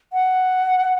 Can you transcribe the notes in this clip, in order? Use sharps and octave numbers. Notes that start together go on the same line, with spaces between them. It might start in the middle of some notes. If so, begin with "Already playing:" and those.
F#5